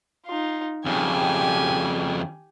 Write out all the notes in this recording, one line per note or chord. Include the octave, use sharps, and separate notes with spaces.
D#4 F4
F2 C#3 G4 G#5